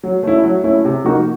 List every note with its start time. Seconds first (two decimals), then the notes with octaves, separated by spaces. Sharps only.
0.03 F#3
0.23 A3 C#4 E4
0.44 F#3
0.64 A3 C#4 E4
0.85 C3
1.05 F3 A#3 D#4 F#4